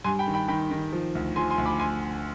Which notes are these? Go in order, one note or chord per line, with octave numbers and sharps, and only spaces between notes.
G2 G#5 C6
G5 B5
D#3
G5 B5
D#3 G5 B5
D#3
F3
D2
F3 G#5 C6
G#5 C6
D2
B5 D6
G#5 C6